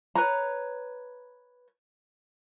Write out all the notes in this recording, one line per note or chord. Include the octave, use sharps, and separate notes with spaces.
B4 C#5 A#5